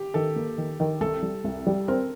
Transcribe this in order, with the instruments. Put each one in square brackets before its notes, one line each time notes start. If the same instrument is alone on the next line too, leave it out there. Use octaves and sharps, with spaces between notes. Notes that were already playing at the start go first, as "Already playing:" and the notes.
Already playing: [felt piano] G4
[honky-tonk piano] D#3 [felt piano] A4
[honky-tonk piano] A#3
D#3
D#3
[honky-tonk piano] C2 [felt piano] A4
[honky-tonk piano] G3
C2
G3
[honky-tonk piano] C4 [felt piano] A#4